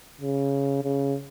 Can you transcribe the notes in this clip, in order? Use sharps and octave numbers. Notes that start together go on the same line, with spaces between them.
C#3
C#3